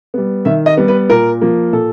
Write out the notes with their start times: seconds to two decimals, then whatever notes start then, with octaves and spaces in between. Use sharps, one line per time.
0.14 G3 B3
0.45 D#3 E5
0.66 D#5
0.77 G3 B3
0.88 B4
1.10 A#2 A#4
1.41 F3 A#3
1.72 A#2 A4